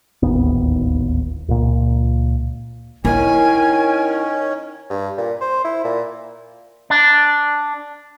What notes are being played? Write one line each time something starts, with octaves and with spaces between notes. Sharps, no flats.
D1 G#1 D#2 B3
C#2 A#2
D#3 C#4 E4 A#4 G#5
G2
A#2
C5
E4
A#2
D4